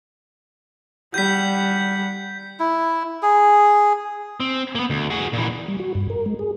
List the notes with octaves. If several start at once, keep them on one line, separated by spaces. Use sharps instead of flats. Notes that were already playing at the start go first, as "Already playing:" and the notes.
G3 F#5 G6 B6
E4
G#4
C4
A#3 B3
D2
F#4 G#4
A#2 E3
G3
F#4
G2
A#4
G#3
G#4